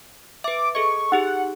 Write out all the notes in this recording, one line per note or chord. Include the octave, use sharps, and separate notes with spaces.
B4 E5 D6
G#4 A4 D#5 C#6
D#4 G4 G#4 F#5